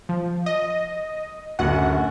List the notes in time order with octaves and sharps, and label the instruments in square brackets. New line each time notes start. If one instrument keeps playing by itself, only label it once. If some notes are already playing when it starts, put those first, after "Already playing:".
[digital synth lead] F3
D#5
[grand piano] D1 F#2 D3 [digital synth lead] F#5